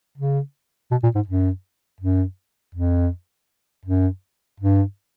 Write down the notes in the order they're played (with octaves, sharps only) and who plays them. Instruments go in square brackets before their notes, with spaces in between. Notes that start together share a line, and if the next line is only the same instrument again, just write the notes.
[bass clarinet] C#3
B2
A#2
G#2
F#2
F#2
F2
F#2
G2